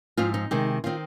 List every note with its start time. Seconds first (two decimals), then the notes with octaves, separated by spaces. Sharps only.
0.17 G#2 F3 C4 F4
0.34 D#4
0.51 C3 D#3 G#3
0.84 D#3 C4 F4